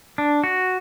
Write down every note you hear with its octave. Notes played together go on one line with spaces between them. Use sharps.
D4
F#4